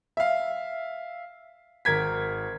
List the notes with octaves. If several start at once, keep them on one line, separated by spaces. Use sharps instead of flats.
E5 F5
G#1 A#4 G#6 B6